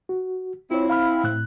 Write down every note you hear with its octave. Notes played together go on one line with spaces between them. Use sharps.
F#4
C4 E4 F4 C#5
F5 B5 F6
A2 F#6